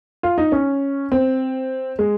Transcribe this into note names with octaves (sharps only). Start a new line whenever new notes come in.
F4
D#4
C#4
C4
G#3